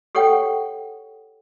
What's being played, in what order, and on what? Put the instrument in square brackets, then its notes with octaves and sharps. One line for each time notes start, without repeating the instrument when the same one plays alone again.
[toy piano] G4 A4 C#5 F#5 G5